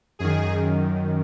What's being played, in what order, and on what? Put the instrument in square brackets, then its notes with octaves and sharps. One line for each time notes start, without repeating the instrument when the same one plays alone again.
[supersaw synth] F#2 D#3 G#4